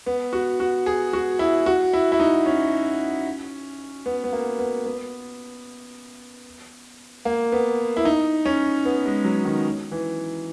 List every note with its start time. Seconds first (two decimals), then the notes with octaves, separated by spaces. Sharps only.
0.06 B3
0.33 F#4
0.60 F#4
0.86 G#4
1.13 F#4
1.39 E4
1.66 F#4
1.93 E4
2.12 E4
2.20 D#4
2.46 C#4
4.06 B3
4.24 B3
4.33 A#3
4.59 B3
4.86 B3
7.25 A#3
7.52 B3
7.97 E4
8.05 D#4
8.46 C#4
8.85 B3
9.06 G#3
9.24 F#3
9.45 D#3
9.92 E3